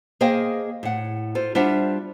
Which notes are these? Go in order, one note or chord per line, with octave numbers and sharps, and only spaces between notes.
A#3 G#4 C5 D#5 F5 G5
A2 F#5
F4 A4 C5
G3 D4 F4 C5 E5 F#5